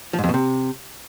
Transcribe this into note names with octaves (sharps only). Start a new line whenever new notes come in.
F3
G#2
F2
B2
C3